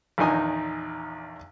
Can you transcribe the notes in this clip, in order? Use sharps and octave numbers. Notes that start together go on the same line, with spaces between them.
A#1 E2 D#3 D#4 G#5 D#6